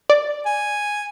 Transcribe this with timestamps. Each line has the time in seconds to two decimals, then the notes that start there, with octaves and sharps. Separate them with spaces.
0.10 D5
0.46 G#5